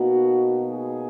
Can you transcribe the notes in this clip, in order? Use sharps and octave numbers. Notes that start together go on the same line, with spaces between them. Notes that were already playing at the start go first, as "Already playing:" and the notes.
Already playing: B2 A#3 D#4 F#4
G#4